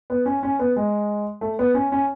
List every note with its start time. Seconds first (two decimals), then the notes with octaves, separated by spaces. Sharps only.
0.10 B3
0.26 C#4
0.43 C#4
0.59 B3
0.76 G#3
1.41 A3
1.59 B3
1.74 C#4
1.92 C#4